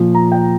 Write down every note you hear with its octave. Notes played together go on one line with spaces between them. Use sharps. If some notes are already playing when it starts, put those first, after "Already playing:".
Already playing: A#2 F3
A#5
G5